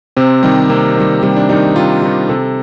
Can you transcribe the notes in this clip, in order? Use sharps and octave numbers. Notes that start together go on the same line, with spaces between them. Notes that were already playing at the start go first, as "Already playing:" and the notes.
C3 C4
D#3 G3
C3 A#3
D#3 G3
C3 G3
D4
D#3 G3 D#4
C3 F4
D#3 G3
C3 A4